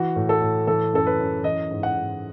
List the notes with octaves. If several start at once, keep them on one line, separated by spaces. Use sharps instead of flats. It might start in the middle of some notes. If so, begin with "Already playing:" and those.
Already playing: E3 F#4
A2
A4
A2
E3 A4
F#2 A4
B4
F#2
E3 D#5
G#2
F#5
G#2